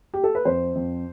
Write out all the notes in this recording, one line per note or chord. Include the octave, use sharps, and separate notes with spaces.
G4
A4
B4
F2 C5
F2